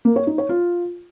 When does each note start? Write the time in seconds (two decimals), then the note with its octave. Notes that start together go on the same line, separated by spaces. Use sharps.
0.05 A#3
0.16 C#5
0.27 D#4
0.38 C#5
0.49 F4